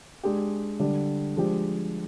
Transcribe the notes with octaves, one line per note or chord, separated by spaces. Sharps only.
G#3 D4 G4
D3 G3 D4
F3 G#3 D4 G4